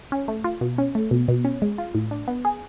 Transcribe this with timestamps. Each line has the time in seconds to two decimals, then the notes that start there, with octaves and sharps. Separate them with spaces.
0.12 C#4
0.28 A3
0.44 F4
0.61 B2
0.78 C#4
0.95 A3
1.11 B2
1.28 B2
1.45 C#4
1.62 G#3
1.78 F4
1.95 A2
2.11 D4
2.28 B3
2.45 G#4